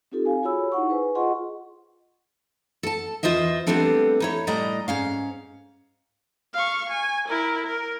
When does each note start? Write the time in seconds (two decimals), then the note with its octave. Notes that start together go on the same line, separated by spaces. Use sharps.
0.12 C4 D#4 F4 G4 A4
0.26 F5 G#5
0.43 F4 F#4 G#4 C#5 B5 E6
0.72 D#4 E4 F#5 C#6
0.89 G#4 B4 C5 G#5
1.15 F4 G#4 D#5 F#5 C6 C#6
2.83 A4 A5
3.23 E2 F4 C5 D#5 E5
3.67 G3 A3 B3 C4 D4 A4
4.20 D#4 E4 C#5
4.47 A2 G3 D5 D#5 A#5
4.88 G#2 C#4 F5
6.54 F5 C#6
6.90 G#5
7.28 E4 A#4
7.66 A#4